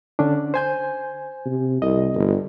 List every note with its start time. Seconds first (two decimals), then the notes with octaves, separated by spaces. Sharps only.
0.19 D3 C#4 D4
0.54 C5 G#5 G6
1.46 C3
1.82 C2 D#5
2.14 G1